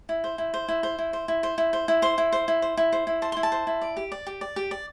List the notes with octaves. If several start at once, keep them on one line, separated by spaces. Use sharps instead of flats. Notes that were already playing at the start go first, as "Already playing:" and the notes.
E4
C5
E4
C5
E4
C5
E4
C5
E4
C5
E4
C5
E4
C5 C6
E4
C5
E4
C5
E4
C5
E4
C5 A5
E4 C6
A5
C5
E4
D5
G4
D5
G4
D5
G4
D5